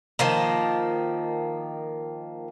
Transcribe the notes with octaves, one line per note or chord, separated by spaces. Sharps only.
D#3 F3 A#3